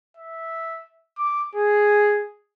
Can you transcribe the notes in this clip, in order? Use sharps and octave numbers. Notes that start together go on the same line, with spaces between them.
E5
D6
G#4